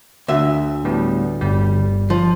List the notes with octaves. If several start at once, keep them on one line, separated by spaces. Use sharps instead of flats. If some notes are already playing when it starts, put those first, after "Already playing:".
D2 E5
A2 G3 B3
G1 G3
F3